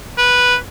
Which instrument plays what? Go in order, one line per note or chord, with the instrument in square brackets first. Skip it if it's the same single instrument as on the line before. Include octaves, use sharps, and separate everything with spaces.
[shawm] B4